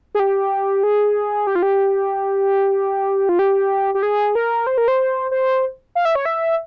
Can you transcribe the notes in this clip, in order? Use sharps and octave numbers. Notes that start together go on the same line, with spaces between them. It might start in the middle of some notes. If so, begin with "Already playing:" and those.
G#4
G4
G#4
G4
F4
G4
F4
G4
G4
G#4
A#4
C5
A#4
C5
C5
F5
E5
C#5
E5